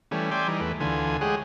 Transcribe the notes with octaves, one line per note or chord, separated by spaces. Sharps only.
E3 G3 A3 C#4
D5 E5 G5 G#5 C6 D6
E3 G3 D#4
E2 A3 B4
D2 D3 E3 F4 G#5
G#3 G4 G#4 C#5 F#5